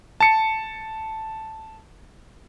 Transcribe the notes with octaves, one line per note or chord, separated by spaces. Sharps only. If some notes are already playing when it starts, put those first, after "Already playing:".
A5 C#7